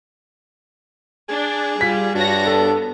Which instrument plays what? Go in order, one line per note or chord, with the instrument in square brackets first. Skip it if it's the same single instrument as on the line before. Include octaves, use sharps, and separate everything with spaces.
[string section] D4 [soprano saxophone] G#4
[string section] G3 [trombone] F4 [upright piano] B6
[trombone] G2 [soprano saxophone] D4 [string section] F#4 C#5 A#6
[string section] B3 [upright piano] A4